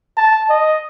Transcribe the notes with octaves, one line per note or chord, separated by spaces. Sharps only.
A5
D#5